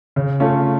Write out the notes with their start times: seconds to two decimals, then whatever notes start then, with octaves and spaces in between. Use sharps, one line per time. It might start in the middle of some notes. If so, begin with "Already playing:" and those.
0.16 C#3
0.40 A3 C#4 F4